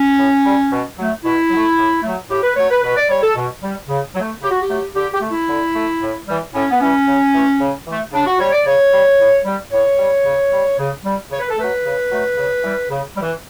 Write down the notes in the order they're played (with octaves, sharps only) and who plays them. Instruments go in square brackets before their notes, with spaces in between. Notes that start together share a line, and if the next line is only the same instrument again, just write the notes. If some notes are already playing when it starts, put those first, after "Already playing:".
Already playing: [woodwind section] C#4
A2
G3
B2
F#3 A3
B2 E4
F#3
A3
A2
F#3 A3
A2 G4
B4
F#3 A3 C#5
B4
B2 B4
D5
G3 C#5
A4
B2
G3
C#3
F#3
A3
C#3 G4
F#4
G4
F#3 A3
D3 G4
G4
A3
E4
D3
A3
A2
E3 G3
A2 C#4
B3
E3 G3 C#4
C#3
E3 A3
C#3
E3 A3
C#3 D4
F#4
G3 C#5
D5
C#3 C#5
G3
A2
G3
A2 C#5
G3
C#3
G3
C#3
G3
C#3 C#5
B4
A4
F#3 A3 B4
C#3
F#3 A3
C#3
E3 G3
C#3
G3
E3